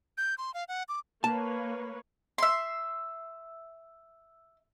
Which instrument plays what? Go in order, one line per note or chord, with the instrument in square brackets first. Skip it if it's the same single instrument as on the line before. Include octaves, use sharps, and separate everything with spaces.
[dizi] G6
C6
F5
F#5
D6
[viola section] A#3 B4 C#5 [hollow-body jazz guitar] A5
[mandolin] E5 C6